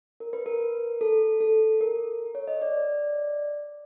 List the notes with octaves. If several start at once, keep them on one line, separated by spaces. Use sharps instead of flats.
A#4
B4
A#4
A4
A4
A#4
C#5
D#5
D5